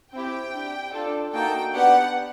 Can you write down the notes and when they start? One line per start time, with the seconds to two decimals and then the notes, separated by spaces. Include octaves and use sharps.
0.13 C4 E4 G4 G5
0.53 D4 G4
0.94 D4 F4 A4
1.34 A#3 D#4 F#4 A4 G5
1.74 B3 D4 G4 F#5